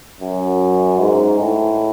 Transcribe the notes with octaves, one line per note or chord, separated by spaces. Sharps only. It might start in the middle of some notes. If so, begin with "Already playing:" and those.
F#2
G#2
A2